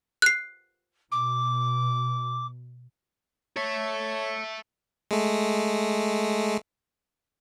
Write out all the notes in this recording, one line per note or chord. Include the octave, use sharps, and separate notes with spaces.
F#6 C7
B2 D6
A4 C#5 E5
G#3 A3